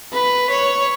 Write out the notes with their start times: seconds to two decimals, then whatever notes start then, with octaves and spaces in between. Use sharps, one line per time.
0.13 B4
0.50 C#5